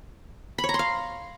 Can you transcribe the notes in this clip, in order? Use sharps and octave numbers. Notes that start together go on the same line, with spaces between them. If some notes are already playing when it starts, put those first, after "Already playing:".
B5
C#5
A#5
C6
F5